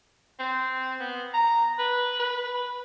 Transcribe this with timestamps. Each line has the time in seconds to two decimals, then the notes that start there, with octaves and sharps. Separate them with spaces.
0.39 C4
1.00 B3
1.33 A#5
1.79 B4
2.19 B4
2.54 B4